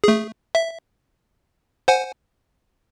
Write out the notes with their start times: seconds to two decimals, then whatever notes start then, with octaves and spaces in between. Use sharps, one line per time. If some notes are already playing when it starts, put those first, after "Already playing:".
0.04 A3 G#4
0.55 E5
1.88 C5 F#5 G#5